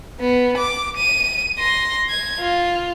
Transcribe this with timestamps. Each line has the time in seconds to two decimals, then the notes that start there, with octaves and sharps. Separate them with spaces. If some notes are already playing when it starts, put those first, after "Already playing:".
0.20 B3
0.58 D6
0.97 D#7
1.59 C6 A#6
2.10 G#6
2.40 F4